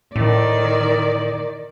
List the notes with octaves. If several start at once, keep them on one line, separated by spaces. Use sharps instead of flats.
A2 D#3 D5